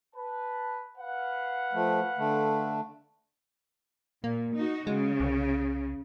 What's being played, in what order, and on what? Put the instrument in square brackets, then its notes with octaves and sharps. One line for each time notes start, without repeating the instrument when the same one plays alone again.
[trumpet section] B4 A5
B4 F5 F#5
[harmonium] F3 A3
D3 A3
[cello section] A#2 [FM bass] A#3
[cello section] D#4 F#4
[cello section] C#3 [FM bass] G#3
[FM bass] C2